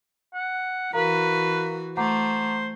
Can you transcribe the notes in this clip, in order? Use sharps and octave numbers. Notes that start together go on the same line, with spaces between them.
F#5
E3 F#4 A#4 B4 F5 A#5
A3 C5 F#5 A#5 D6